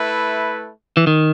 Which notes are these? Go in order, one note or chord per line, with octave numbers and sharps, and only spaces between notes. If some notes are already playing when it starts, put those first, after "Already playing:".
Already playing: A3 E4 B4
E3
D#3